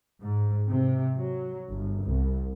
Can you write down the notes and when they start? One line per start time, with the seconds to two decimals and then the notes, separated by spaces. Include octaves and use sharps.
0.21 G#2
0.67 C3
1.15 F#3
1.70 G1
2.04 C2